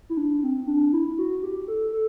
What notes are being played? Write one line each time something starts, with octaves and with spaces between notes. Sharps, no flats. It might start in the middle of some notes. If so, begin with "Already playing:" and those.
E4
D4
C4
D4
E4
F#4
G4
A4
A4